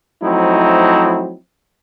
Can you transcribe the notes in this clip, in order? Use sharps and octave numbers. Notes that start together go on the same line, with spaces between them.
F3 F#3 A3 C4 D#4 E4